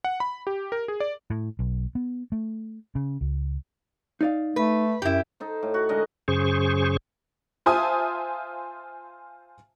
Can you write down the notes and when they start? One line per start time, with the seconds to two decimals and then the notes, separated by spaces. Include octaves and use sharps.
0.04 F#5
0.20 B5
0.47 G4
0.72 A#4
0.88 G#4
1.00 D5
1.30 A2
1.59 B1
1.95 B3
2.32 A3
2.95 C#3
3.21 C#2
4.21 D#4 D5 F5
4.56 A3 B4
5.02 F#2 E4 G4
5.40 D#4 A4 C5
5.63 A2
5.74 F#4
5.89 D3 G#3 A#4 D#5
6.28 F#2 C#3 G#4 C5 C#6
7.66 F4 C5 E5 G#5 A5 D#6